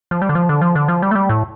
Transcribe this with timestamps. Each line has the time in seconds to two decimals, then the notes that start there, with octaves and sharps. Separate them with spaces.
0.11 F3
0.22 G3
0.29 D3
0.35 F3
0.49 D3
0.61 F3
0.75 D3
0.88 F3
1.02 G3
1.11 A3
1.15 G3
1.29 A2